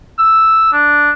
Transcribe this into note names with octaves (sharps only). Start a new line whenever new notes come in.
E6
D4